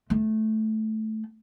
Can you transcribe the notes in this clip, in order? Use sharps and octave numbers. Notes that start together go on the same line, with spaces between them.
A3